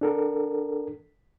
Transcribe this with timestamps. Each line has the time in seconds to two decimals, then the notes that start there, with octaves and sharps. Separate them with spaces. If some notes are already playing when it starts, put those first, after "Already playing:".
0.01 D4 A4 A#4